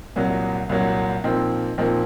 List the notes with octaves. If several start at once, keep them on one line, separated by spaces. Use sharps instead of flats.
C2 A#2 F#3
C2 A#2 F#3
A#2 F3 C4 D#4
A#2 F3 C4 D#4